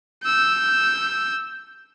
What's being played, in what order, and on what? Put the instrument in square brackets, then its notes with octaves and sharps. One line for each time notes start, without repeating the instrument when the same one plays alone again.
[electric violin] E6 G6